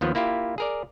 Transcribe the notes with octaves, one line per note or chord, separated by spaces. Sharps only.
D#2 D#3 F3 B3
A#3 E4 F4 G4
G#4 A#4 D5